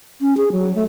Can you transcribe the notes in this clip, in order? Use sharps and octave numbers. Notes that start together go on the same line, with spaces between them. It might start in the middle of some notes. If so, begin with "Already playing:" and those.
C#4
G#4
F#3
A3